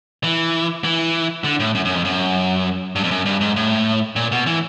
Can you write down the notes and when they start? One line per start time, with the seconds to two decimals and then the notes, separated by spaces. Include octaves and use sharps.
0.24 E3
0.84 E3
1.44 D3
1.60 A2
1.75 F#2
1.85 F#2
1.95 F2
2.05 F#2
2.96 G2
3.04 F2
3.11 F#2
3.26 G2
3.41 G#2
3.56 A2
4.16 A#2
4.32 B2
4.47 E3